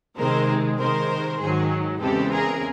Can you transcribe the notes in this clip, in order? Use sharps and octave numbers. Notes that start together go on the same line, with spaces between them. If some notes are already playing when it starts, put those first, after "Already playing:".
C3 D#3 G#3 C4 A#4 C5
C3 D#3 G#3 A#4 C5
G#2 D#3 F#3 G#4
E2 C#3 E3 G#3 C4 G4 A4
G#4 A#4